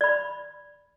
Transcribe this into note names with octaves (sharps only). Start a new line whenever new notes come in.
D5 B5